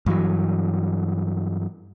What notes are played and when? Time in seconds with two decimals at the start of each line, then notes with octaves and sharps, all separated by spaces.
0.06 G2 E3 F#3